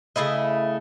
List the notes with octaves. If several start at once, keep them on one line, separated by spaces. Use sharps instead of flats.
C#3 A3 E4 D#5